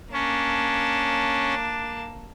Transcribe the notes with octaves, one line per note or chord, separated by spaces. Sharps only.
A#3 C#4 D4 A5